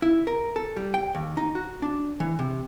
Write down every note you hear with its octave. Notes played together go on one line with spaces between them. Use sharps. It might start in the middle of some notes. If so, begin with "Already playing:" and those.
E4
A#4
A4
G3
G5
D#2
D#4
F#4
D4
E3
C3